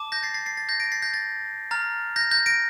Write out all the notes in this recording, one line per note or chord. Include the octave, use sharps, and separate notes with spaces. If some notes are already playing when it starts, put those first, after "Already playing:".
Already playing: A5 D6
G6 A#6
A6 C7
A6 C7
A6 C7
A6
G6 A#6
A#6 D7
A6 C7
G6 A#6
A6
A#5 F6 A6
G6 A#6
G6 A#6
A#6 D7